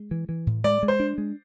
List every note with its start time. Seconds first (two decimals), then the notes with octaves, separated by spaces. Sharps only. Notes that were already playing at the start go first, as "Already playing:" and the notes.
Already playing: G#3
0.11 E3
0.29 E3
0.47 A2
0.64 G#3 D5
0.83 G#3
0.88 C5
1.00 D4
1.18 G#3